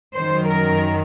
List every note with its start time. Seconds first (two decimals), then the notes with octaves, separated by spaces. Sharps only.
0.15 F#2 D#3 F#3 C5
0.49 A#4